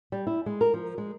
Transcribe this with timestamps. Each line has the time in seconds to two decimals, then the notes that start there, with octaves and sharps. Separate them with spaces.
0.12 G3
0.27 E4
0.46 G#3
0.61 A#4
0.74 F3
0.98 G#3